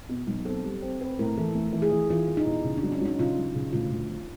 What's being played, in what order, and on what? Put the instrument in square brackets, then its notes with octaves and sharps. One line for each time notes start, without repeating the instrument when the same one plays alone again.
[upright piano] B2
B1
[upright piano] C4 [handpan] A4
[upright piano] G3
C4
[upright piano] C4 [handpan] B4
[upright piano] A2 [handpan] A#4
[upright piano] E3 [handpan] A4
[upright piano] A3
E3
[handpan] G#4
[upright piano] E3
[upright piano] E3 [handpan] F4
[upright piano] E3
[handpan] D#4
[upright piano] E2
C#3
[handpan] D4
[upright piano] F#3
[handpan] C#4
[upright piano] F#3 [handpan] D#4
[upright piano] C#3 [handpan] F4
[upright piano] F#3
C#3
[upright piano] D2 [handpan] F4
[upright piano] D2
F3